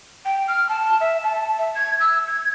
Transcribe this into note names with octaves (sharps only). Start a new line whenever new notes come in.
G5
F6
A5
E5
A5
E5
G#6
E6
G#6